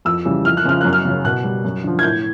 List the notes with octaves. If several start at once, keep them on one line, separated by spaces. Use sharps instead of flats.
F2 E6
C#3 E3 G3
F2 F6
F#6
C#3 F3 F6
F#2 F#6
F6
C#3 F#3
B2 F#6
G3
F#2
D3 F3
G#6
A2 G6